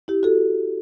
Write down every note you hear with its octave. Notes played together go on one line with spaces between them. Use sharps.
E4 G4
F#4 A4